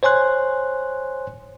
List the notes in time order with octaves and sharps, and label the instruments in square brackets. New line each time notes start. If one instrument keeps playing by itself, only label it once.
[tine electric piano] C5 C#5 G#5 C6 F#6